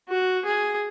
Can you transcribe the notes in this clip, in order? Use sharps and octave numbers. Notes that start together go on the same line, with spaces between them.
F#4
G#4